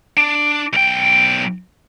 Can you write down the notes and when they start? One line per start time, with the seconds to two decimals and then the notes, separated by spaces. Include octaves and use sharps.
0.17 D4
0.73 B1 G5